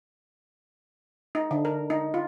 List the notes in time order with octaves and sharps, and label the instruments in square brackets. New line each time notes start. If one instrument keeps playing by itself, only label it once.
[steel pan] D#4
D3
A#4
D#4
F4